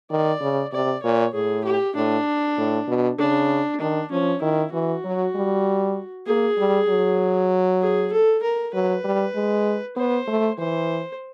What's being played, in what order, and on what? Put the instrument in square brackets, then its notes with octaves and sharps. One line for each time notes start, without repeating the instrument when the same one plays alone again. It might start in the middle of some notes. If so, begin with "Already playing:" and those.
[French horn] D#3 [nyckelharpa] D5
[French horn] C#3
[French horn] C3 [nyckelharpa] D5
[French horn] A#2 [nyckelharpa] C#5
[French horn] A2 [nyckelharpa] G#4
[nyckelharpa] G4
[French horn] A2 [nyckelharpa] D4
[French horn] A2
B2
[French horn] C#3 [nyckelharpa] D4
[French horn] D#3 [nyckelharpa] D4
[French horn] F3 [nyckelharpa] C#4
[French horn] D#3 [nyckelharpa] E4
[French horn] E3 [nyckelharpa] F#4
[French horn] F#3
G3
[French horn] A#3 [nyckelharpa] G#4
[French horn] G3
F#3
[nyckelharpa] G#4
A4
A#4
[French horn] F#3 [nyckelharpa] B4
[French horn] G3
G#3
[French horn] B3 [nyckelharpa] C5
[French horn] A3
[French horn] E3 [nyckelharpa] C5